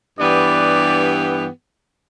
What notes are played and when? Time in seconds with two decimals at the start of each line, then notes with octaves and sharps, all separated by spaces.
0.19 G2 E3 B3 G4 D5